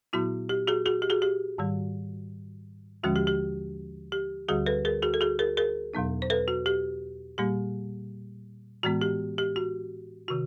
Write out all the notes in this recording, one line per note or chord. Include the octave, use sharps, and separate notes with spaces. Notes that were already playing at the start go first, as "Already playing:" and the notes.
A#2 F#3 B3 E4 F#4
G4
F#4 G#4
F#4 G#4
G4
F#4 G#4
G4
G#2 D#3 G3
D#2 D3 F3 G#3 C#4 F#4
G4
G4
G4
D2 D3 G3 F#4 G#4
A4 B4
G#4 A#4
F#4 G#4
A4
F#4 G#4
G#4 A#4
G#4 A#4
E2 B2 F#3 B3 D#4
C5
A4 B4
F#4
G4
A#2 G3 A#3 G4
A2 E3 G#3 B3 F#4
G4
G4
F#4
C3 D#3 F#4